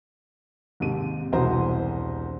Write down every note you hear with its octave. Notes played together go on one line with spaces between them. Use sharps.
D#2 G#2 C3 D#7
E1 C2 F#4 C5 A#5